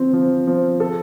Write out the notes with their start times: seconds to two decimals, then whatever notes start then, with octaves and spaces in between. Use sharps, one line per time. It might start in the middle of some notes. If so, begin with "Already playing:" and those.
Already playing: F3 C4
0.13 F3
0.47 F3
0.80 A4